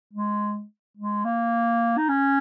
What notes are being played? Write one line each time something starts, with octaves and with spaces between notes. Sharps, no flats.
G#3
G#3
A#3
D#4
C#4